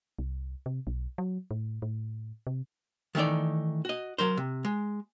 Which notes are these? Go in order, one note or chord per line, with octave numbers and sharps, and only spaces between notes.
C2
C3
B1
F#3
A2
A2
C3
D#3 E3 A3 D#4 D5
F#4 D#5
F#3 A#4 C5
C3
G#3